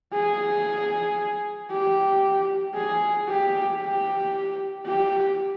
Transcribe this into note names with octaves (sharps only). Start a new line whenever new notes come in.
G#4
G4
G#4
G4
G4
G4